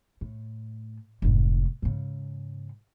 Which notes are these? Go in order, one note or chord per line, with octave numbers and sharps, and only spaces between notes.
A2
F1 G#2
G#2 C#3